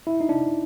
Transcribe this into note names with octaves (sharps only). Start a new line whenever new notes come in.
E4
D#4
D4